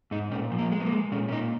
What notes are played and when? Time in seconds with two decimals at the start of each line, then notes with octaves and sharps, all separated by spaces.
0.11 G#2 D#4
0.31 A#2 C#4
0.52 F3
0.58 A#3
0.72 G#3
0.80 B3
0.85 A#3
0.92 G#3
1.12 A#2 C#4
1.28 C#4
1.32 A#2 D#4